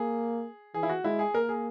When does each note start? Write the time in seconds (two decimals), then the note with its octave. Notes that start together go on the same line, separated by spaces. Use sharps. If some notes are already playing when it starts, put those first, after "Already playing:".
Already playing: A#3 G#4
0.74 E3 G#4
0.83 E4
0.89 F#4
1.04 G#3 E4
1.19 G#4
1.34 A#3 A#4
1.49 G#4